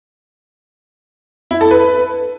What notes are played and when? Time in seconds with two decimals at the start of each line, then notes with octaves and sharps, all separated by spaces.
1.51 E4
1.61 A4
1.71 B4